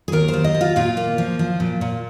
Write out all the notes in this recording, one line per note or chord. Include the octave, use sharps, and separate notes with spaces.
G#4
D#2 A#4
C5
D#2
D#5
D#2
F4
A#2 F4
A#3
F3
F3
A#2
A#2